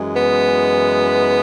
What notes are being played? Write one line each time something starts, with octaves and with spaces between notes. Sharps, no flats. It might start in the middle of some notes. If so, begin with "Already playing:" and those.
Already playing: F#2 E3 G#3
B3